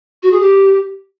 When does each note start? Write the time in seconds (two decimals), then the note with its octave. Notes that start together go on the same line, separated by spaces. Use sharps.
0.23 F#4
0.32 G#4
0.40 G4